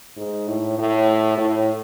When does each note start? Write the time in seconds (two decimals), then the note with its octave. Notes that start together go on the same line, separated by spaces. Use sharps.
0.17 G#2
0.47 A2
0.78 A2
1.37 A2